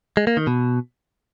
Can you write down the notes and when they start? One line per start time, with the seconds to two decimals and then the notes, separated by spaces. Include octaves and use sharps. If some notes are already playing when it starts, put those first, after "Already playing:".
0.17 G#3
0.27 A#3
0.37 D#3
0.47 B2